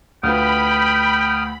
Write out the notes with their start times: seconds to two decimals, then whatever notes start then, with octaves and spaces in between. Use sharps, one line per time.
0.23 D2 F4 B4 G5 B5 D#6 F6